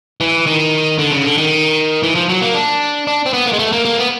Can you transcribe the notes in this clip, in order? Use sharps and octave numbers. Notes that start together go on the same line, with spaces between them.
E3
D#3
D3
C#3
D3
D#3
E3
F3
F#3
A#3
D4
D4
C4
B3
A#3
G#3
A3
A#3
A#3
B3